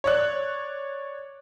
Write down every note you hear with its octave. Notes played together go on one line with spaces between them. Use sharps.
C#5 D5 F#6